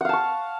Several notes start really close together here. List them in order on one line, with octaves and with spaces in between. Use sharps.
F#5 F5 A5 C#6